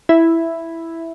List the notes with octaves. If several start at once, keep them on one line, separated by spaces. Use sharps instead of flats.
E4